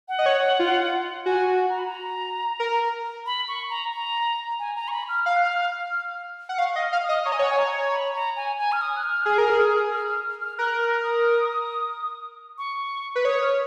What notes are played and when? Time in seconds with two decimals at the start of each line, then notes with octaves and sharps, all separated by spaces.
0.08 F#5
0.19 D#5
0.26 C#5
0.59 F4
1.26 F#4 G#5
1.70 A#5
1.79 B5
1.86 A#5
2.60 A#4
3.26 B5
3.48 C#6
3.70 A#5
3.92 A#5
4.59 G#5
4.76 A#5
4.88 C#6
4.92 B5
5.09 F6
5.26 F5 F6
5.36 F#6
5.46 F6
6.49 F#5
6.58 F5 C#6
6.76 D#5
6.81 F6
6.92 F5
7.03 D#6
7.09 D#5
7.25 C#5 A#5
7.32 D#5 G#5
7.39 C#5 F#5
7.50 G#5
7.59 A#5
7.92 B5
8.14 A#5
8.36 G#5
8.58 G#5
8.72 F6
8.81 D#6
8.96 F#6
9.03 F6
9.25 G#4
9.38 A#4
9.50 G#4
9.91 F6
10.08 F6
10.42 F6
10.58 A#4 F#6
10.81 F6
11.03 D#6
12.58 C#6
13.15 B4
13.25 C#5 D#6
13.42 F6